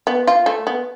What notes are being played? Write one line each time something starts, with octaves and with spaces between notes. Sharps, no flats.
B3
F4
A3
B3